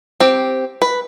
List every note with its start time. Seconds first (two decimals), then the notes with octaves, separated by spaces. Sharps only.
0.20 C4 G4
0.82 B4